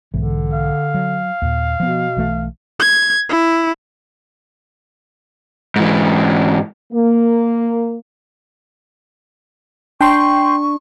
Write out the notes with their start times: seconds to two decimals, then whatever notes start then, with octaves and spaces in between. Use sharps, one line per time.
0.14 B1 G#2 D3 E3
0.53 F5
0.94 F#3
1.42 D#2 A#2
1.80 B2 F3 B3
2.17 B1 E3 A3
2.80 G#6
3.30 E4
5.76 G#2 E3
6.92 A#3
10.01 D4 G5 C6 C#6